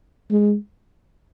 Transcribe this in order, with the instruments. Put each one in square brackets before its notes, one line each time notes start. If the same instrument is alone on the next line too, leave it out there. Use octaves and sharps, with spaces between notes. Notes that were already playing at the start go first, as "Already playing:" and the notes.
[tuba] G#3